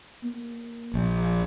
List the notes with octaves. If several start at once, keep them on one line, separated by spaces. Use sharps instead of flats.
A#3
A#1